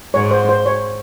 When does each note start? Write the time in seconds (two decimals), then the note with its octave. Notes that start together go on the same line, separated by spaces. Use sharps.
0.14 G#2 C#5
0.31 C5
0.49 C5
0.66 C#5